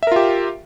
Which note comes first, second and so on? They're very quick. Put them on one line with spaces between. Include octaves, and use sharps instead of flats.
E5 A#4 F4 G4